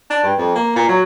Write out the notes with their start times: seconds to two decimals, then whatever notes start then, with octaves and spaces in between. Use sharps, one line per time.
0.10 D4
0.23 G2
0.38 F2
0.55 A#3
0.76 A#2
0.88 F#3